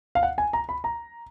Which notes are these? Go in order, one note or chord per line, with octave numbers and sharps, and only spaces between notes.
F5
F#5
G#5
A#5
B5
A#5